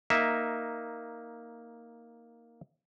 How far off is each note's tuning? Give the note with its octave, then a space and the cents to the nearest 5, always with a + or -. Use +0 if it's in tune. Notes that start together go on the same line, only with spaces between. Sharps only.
A#3 +0 D#4 +5 E5 -5